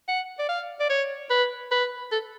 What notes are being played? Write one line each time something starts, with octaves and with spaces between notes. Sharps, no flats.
F#5
D5
F5
D5
C#5
B4
B4
A4